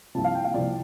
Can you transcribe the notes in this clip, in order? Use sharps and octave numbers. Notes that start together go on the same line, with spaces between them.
C2 C3 F3 A5
F5
G5
F5
C2 C3 F3 D5